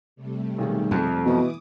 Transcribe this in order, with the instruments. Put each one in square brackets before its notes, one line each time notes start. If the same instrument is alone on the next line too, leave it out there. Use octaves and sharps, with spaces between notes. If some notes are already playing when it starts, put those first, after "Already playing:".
[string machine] C3 G3 A3
[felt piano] B1 D#3 G#4
[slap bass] F2
[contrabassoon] B2 [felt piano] E3 B3 E4 [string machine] D6 D#6